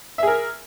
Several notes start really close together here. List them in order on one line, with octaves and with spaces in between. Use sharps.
E5 G#4 A#4